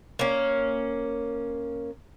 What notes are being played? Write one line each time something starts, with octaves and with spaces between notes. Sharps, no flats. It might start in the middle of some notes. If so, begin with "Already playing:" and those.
A#3 C#4